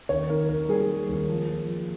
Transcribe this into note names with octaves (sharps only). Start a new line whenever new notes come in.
D#2 C#5
D#3 A#4
D#2 A#4
G3 G#4
G3
D#2
F3
F3
F3